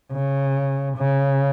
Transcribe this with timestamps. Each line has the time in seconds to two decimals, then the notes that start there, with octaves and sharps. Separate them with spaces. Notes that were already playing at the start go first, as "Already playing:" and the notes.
0.12 C#3
0.97 C#3